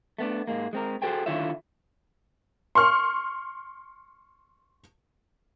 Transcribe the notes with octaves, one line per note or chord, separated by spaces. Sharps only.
A3 B3 D4
G#2 G#3 A#3
G#3 C4 A#4
F#4 G#4 A4 C5 G5 G#5
D3 D#3 E4 F4 C#5 E5
C6 C#6 F6